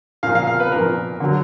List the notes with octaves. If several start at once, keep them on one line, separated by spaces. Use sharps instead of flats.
A#2 F3 F5
F5
F5
B4
A#2 F3 A#4
D3 F#3